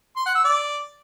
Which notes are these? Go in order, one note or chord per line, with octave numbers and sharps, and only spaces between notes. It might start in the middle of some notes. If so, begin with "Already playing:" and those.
C6
F#5
E6
D5